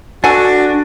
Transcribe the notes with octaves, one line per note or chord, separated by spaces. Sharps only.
D4 F#4 A4 F#5 G#5